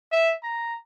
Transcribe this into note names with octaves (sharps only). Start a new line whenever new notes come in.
E5
A#5